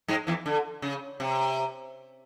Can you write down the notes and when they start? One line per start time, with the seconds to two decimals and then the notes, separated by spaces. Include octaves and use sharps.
0.08 G#2 G#3
0.27 E2 E3
0.46 D3
0.82 C#3
1.20 C3